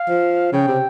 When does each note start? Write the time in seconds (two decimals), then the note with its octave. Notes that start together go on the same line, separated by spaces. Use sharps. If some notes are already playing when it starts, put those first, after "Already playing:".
Already playing: F5
0.09 F3
0.53 C#3 G5
0.68 C3